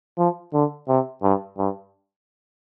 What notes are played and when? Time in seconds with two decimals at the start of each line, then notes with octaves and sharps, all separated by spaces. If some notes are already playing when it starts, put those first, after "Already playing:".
0.18 F3
0.53 D3
0.88 C3
1.23 G2
1.58 G2